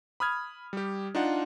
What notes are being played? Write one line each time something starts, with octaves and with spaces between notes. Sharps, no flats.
B5 D#6 F6 G#6
G3 G4
D4 D#4 F4 F#5